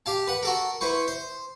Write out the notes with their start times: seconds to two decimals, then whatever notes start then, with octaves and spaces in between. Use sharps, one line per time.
0.06 G4 F5 A5
0.27 B4 F#5
0.43 F#4 A4 A#4
0.81 E4 B4 C5 C#6
1.08 C5